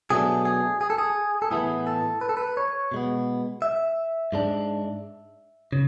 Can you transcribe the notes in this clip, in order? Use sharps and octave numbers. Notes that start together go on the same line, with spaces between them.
B2 F#3 A3 D4 G#4
G#4
G#4
A4
G#4
A4
A2 E3 B3 E4 G#4
A4
B4
A4
B4
C#5
B2 G#3 B3
E5
G#2 G#3 D4
C#3